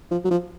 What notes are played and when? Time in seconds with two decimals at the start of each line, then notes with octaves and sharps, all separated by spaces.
0.11 F3
0.25 F#3
0.31 F3